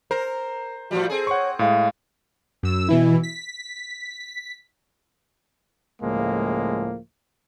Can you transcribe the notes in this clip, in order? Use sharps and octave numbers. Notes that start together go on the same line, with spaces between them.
A#4 C5
A2 F3 G3 F#4
C4 G#4 A4
C#5 F#5 C#6
A2 G#3 F5
F#2 E6
B2 E3 E4
B6
C#2 A2 F3 G#3 A#3